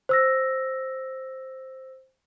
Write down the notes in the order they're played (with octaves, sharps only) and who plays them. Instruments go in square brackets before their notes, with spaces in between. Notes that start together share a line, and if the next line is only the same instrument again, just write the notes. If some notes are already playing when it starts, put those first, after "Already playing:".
[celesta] C5 E6 A#6